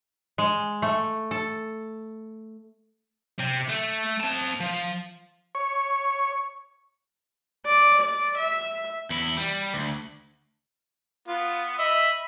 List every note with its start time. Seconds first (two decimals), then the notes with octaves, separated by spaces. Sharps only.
0.38 G#3
0.82 A3
1.31 A4
3.40 C3 C4
3.70 A3
4.21 C4 A5
4.61 F3
5.55 C#5 C#6
7.65 D5
8.01 D5
8.37 E5
9.10 E2 E4
9.38 G3
9.74 D2
11.28 B3 F4
11.79 D#5 E5 B5 E6